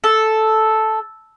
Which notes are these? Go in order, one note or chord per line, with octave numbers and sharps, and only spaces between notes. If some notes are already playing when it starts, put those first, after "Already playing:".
A4